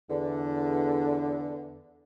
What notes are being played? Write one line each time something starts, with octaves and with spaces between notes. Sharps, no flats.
E2 D3